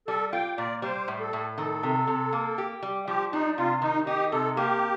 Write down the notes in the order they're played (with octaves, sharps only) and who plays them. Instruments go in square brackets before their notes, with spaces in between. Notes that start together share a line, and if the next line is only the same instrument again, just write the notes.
[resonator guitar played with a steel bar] G3 [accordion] A4
[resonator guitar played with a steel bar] F4 [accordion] G5
[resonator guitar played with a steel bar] A#2 [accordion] D5
[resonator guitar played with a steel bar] G3 [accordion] C5
[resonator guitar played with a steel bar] A2
[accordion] A4
[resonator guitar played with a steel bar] A2
[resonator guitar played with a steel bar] D#3 [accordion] A4
[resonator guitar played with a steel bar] C3
C3
A#3
G4
G3
[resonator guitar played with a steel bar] F3 [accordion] G4
[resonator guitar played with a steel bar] D4 [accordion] D#4
[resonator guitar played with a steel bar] C3 [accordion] F4
[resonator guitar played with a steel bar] D#3 [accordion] D#4
[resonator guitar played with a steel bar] D#4 [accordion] G4
[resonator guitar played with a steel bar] C3 [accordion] A4
[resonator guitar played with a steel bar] A#3 [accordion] G4